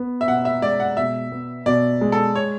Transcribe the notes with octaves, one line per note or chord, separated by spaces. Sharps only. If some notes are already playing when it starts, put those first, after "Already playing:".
Already playing: B3
E5
B2 F#5
E5
G#3 D5
F#5
B2 E5
B3
B2 D5
G#3
A4
C#5